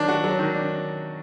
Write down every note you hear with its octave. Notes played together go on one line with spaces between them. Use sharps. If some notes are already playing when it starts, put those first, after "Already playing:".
Already playing: D#3 F#3 D4
F#4
F#3
D#3
D4